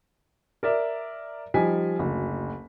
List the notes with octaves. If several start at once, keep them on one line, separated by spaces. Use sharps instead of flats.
A#4 D5 E5
F3 G3 D#4 G#5 B6
F#1 D2